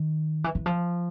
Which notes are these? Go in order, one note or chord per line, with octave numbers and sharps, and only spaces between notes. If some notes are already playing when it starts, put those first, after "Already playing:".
Already playing: D#3
E3
E3
F3